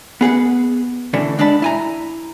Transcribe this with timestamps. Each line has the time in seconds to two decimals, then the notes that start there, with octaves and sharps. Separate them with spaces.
0.21 B3 G#4 B4 F#5
1.13 D3 E3 A3 C#4 D4
1.38 D3 G#3 D4 D5 A5 B5
1.62 E4 G#5 A#5